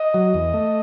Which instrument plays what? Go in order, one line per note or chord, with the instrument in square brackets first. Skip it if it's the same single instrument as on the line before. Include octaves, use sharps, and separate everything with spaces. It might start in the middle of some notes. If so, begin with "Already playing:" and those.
Already playing: [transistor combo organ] D#5
F#3
E2
A3